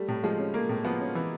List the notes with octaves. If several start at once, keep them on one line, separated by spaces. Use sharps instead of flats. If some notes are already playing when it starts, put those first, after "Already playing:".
Already playing: G3 A3
A2
F3 G#3
C#4
A3 A#3
A2
F3 B3
C#4
E3